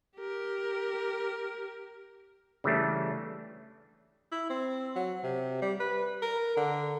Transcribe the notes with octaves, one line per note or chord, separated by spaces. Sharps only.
G4 A#4
C#3 E3 G3 A3 D4
E4
C4
F#3
C3
G3
B4
A#4
D3